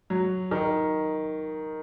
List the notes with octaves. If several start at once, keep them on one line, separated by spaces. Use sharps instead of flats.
F#3
D#3